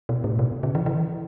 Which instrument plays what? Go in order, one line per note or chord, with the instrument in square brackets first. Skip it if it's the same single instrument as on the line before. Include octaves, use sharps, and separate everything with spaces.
[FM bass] B2
A2
B2
C#3
E3
E3